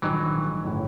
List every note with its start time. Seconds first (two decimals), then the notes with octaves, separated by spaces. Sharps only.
0.02 A#1 G#2 D#3 E3 F#3
0.64 G1 A2 C#3